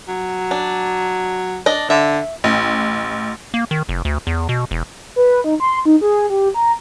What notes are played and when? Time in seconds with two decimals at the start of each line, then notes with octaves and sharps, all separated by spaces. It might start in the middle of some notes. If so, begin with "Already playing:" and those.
0.08 F#3
0.51 D4
1.66 D4 D#5
1.90 D3 E5
2.44 A1
3.54 A#3
3.71 D#3
3.89 F1
4.05 D2
4.27 E2
4.49 B2
4.71 E1
5.16 B4
5.44 D#4
5.60 C6
5.85 D#4
6.01 G#4
6.30 G4
6.54 A#5